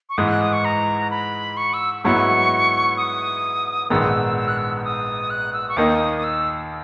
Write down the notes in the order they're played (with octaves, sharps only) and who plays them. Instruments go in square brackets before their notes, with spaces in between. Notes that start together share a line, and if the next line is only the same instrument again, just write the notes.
[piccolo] C#6
[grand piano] G#2 E3 G#3 [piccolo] D#6
[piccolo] F#6
D#6
C#6
A#5
B5
C#6
E6
[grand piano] G#2 F#3 B3 E4 [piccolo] C#6
[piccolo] D#6
[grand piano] A#1 G#2 D#3 G#3 B3 [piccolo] E6
[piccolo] E6
F#6
E6
E6
D#6
F#6
E6
C#6
[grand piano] D#2 D#3 A#3 D#4 [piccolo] D#6
[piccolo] D#6
E6